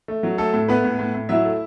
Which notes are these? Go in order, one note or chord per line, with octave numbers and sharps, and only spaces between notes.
A3
F#3
A3 A4
A2
A3 B3 B4
A2
A2
A2
F#3 E4 E5
A3